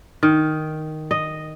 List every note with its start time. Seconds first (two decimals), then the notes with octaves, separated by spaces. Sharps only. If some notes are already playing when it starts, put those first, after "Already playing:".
0.23 D#3
1.11 D#5